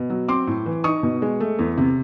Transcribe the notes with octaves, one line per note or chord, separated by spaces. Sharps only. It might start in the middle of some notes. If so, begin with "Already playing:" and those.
Already playing: B2
F#3
C4 C6 D6
A2
E3
D#4 C#6 D#6
B2
G#3
A3
E2
C3